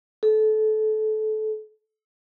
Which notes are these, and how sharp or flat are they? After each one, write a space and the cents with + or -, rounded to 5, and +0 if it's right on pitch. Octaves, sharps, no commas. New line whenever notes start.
A4 -25